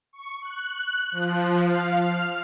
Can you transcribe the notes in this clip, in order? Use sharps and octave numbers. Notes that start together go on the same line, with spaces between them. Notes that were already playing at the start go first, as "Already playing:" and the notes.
C#6
F#6
F3
F5
F6